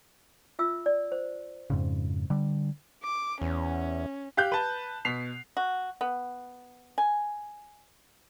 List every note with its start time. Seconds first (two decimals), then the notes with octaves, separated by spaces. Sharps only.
0.59 F4 E5 E6
0.86 D5
1.12 C5
1.70 F2 G#2 C#3
2.30 D3 G3
3.03 D6
3.41 E2 C#4
4.37 G4 F5 F#6 G6
4.52 B4 A5
5.05 B2 B6 C7 F7
5.57 F#4
6.01 B3
6.98 G#5